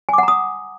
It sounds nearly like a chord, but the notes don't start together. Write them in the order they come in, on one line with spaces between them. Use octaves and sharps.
G#5 D6 F#5 A#5 D#6